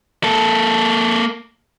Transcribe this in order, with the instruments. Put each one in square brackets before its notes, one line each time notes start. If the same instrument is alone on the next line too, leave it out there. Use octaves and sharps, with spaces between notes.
[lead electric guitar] A#3 A4